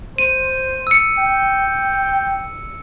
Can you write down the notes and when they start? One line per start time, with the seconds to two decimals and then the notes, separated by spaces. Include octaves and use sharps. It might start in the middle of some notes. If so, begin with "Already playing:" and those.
0.18 C5 D#7
0.87 E6 C#7
1.18 G5